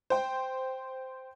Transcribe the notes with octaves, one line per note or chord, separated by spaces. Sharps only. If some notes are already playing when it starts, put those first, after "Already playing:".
C5 G5